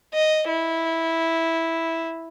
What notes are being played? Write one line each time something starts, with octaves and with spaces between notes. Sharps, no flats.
D#5
E4